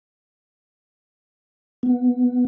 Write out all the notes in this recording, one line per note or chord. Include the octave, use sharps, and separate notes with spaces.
B3